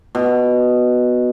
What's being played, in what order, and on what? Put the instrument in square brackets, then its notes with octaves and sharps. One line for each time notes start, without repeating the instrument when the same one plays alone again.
[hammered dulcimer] B2